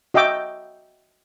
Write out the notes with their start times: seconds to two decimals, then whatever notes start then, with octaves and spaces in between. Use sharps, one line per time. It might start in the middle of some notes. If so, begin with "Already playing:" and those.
0.14 F#4 D#5 E5 G5 D6